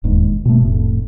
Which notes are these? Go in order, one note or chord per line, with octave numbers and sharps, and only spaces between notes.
E1 D#2 G#2
B2 A3
F1 A2